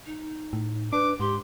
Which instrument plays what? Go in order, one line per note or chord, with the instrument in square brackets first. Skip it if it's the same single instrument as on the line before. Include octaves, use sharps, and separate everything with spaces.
[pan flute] D#4
[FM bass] A2
[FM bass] D4 [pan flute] B4 [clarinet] D6
[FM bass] G#2 [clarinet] G4 [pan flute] C6